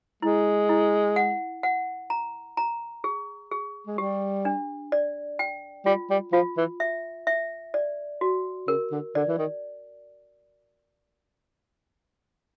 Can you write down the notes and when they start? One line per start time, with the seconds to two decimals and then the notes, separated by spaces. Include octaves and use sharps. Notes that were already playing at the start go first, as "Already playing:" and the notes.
0.22 G#3 E4
0.69 E4
1.16 F#5
1.63 F#5
2.10 A#5
2.57 A#5
3.04 G#4
3.51 G#4
3.87 G#3
3.98 G3 G4
4.45 D4
4.92 D5
5.39 G5
5.86 G3 F4
6.10 G3
6.33 F3 F4
6.57 E3
6.80 E5
7.27 E5
7.74 D5
8.21 F#4
8.68 C#3 A#4
8.92 D3
9.15 D3 D5
9.28 E3
9.38 D#3